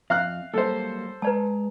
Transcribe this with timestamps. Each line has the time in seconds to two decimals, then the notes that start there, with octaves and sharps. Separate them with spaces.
0.10 F2 E5 F5 F6 F#6
0.54 F#3 G3 A#3 A4 C5
1.22 G#3 B4 D5 A5 A#5